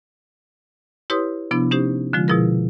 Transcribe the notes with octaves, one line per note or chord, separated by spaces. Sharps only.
E4 G4 B4 C#5 C6 D#6
C3 F3 B3 D4 E4
C#4 D#4 G4 C5
D3 F3 G#3 F4
B2 F3 E4 G#4 A#4